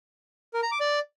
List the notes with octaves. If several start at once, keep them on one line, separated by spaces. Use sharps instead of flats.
A#4
A#5
D6
D5